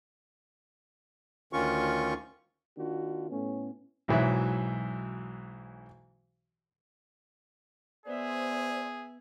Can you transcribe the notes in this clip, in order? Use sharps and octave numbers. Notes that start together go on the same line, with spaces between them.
D2 D#3 C#4 F4 C#6
D#3 A#3 D4 F4 F#4
A2 A3 B3 C#4
B1 G#2 E3 F#3 E5
B3 G#4 C5 D5 E5